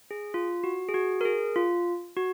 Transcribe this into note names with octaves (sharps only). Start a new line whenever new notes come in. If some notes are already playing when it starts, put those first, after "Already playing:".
G#4
F4
F#4
G#4
F#4
A#4
G#4
F4
F#4